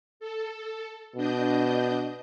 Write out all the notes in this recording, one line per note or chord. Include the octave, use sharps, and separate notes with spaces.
A4
B2 D4 D#5 G6